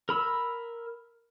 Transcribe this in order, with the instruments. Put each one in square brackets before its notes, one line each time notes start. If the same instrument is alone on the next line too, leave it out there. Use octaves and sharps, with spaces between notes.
[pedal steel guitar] A#4 B5 E6